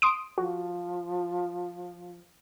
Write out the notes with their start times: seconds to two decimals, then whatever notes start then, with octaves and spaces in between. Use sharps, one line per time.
0.02 C6 D#6 D7
0.38 F3 F#4